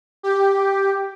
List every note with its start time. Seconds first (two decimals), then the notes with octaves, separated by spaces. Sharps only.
0.23 G4